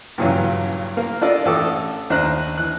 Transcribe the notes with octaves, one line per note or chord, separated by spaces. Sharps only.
G2 A#2 C#3 E3 F#3
A#3
D4 F4 A4 D5 D#5
A1 A4 D6 D#6
D#2 D4 C5 D#5 A#5 F#6
E3 F#6